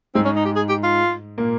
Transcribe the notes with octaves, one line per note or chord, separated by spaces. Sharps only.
G#2 G#3 C4
C#4
D#4
G4
G#4
G4
F4
A#2 A#3